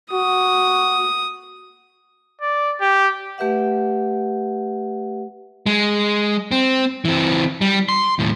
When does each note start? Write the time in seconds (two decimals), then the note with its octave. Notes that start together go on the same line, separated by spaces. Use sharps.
0.12 F#4 D#6
2.42 D5
2.81 G4
3.38 A3 G4 B4 E5 F#5
5.66 G#3
6.51 C4
7.05 E3 C4
7.61 G3
7.89 C6
8.19 D#2 A2